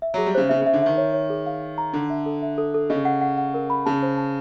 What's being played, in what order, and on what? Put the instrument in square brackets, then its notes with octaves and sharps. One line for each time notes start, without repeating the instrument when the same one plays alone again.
[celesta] E5
[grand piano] F#3 [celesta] G#4
[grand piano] G3
[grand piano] C#3 [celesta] C5
[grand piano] C#3 [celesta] E5
[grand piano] C#3 [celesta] E5
[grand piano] D3
[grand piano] D#3 [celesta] E5
[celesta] C#5
C#5
G#4
F5
F5
A#5
[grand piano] D3 [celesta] A4
[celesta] E5
A4
E5
A4
A4
[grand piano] C#3 [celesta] D#5
[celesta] F#5
F#5
F#5
A#4
B5
[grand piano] C#3 [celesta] A5
[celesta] C5
A5